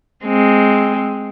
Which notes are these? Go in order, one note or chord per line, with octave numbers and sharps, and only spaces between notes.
G#3 C4